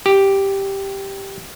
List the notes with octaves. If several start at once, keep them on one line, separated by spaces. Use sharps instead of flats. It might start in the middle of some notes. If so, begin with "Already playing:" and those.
G4